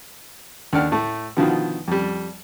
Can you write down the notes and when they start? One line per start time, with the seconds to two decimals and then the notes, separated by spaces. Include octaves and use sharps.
0.73 D#2 D3 D5 F#5 F6
0.92 A2 A3
1.37 B2 D3 D#3 F3 F4 F#4
1.88 F2 G3